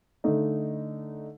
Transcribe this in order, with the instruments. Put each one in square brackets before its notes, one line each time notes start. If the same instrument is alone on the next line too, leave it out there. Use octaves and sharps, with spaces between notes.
[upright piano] D3 A3 D#4